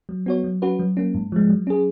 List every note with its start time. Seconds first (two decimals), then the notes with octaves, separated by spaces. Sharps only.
0.09 F#3
0.26 B3 F#4 C#5
0.44 F#3
0.62 C#4 F#4 B4
0.79 F#3
0.97 A#3 C#4
1.14 G#2
1.32 F3 G#3
1.49 F#3
1.67 C#4 G#4